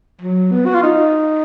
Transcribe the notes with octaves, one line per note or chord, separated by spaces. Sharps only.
F#3
B3
F#4
F4
D#4